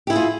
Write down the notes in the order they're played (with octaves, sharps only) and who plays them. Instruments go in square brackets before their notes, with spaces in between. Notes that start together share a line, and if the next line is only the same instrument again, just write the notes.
[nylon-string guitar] G4
E4
G#4
F4